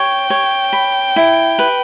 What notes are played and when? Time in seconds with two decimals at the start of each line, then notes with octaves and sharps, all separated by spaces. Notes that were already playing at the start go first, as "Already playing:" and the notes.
Already playing: C#5 G5
0.30 C#5
0.73 B5
1.16 E4
1.59 B4